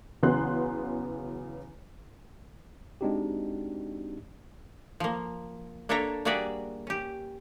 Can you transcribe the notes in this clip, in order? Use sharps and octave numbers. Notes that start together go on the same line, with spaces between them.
E2 C#3 F#3 B3 C6 F#6
G#3 C4 D4 D#4 F#4 G4
F3 A#3
A#3 D4 A4 C#5 E5 A#5
G3 A#3 F#4 G#4 D5 E5
C#4 G4